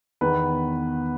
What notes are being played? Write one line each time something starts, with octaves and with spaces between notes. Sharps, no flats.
E2 D#3 B3 B4